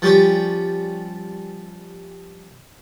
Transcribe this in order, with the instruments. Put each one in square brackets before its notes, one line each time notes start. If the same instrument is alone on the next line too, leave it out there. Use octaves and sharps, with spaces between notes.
[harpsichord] F3 G3 C#4 G4